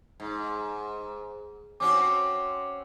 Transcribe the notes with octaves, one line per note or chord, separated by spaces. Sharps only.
G#2
C4 C#4 F#4 D6